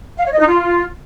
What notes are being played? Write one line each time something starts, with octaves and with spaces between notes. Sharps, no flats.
F5
C#5
D#5
D#4
F4